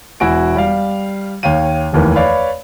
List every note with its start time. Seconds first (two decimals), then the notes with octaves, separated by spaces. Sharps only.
0.20 E1 E4 F#4 G#5 D7
0.56 G3 F5
1.43 D#2 C#5 F5 G5 D#7
1.93 F1 D#2 E3 A#4
2.16 B4 C#5 D5 F5 B5